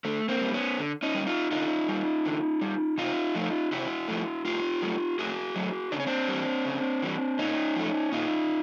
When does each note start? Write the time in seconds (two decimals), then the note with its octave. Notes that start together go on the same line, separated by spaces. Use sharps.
0.05 D3 A3
0.29 A#3 C4
0.41 G3
0.54 B3 C#4
0.78 D3
1.03 C#4 D#4
1.14 G3
1.27 D#4 F4
1.51 D3 D#4 F4
1.88 G3
2.25 D3
2.61 G3
2.98 C3 D#4 F4
3.35 F3 A3
3.72 C3 E4 F#4
4.08 F3 A3
4.45 A2 F4 G4
4.82 F#3 A3
5.19 A2 F#4 G#4
5.56 F#3 A3
5.92 C#3 D4
6.00 C#4
6.06 C4 D4
6.28 G3
6.34 E3
6.66 C#3
7.02 E3 G3
7.39 A#2 C#4 D#4
7.76 F3 A3
8.12 A#2 D#4 F4